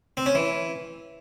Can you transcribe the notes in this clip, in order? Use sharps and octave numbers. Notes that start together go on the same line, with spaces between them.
C4
C#4
E3